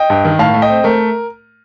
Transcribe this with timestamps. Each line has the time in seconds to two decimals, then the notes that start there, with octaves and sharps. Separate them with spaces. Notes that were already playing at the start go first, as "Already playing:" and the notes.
Already playing: D#5 G5
0.10 G2
0.25 D#3
0.39 A2 F5 A5
0.54 A3
0.62 D#5 G5
0.70 C4
0.84 A3 A#4